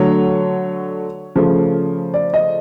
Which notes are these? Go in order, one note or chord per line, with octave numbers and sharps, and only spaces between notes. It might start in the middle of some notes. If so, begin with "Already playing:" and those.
Already playing: D3 F#3 A3 C#5
C#3 F3 A3
D5
D#5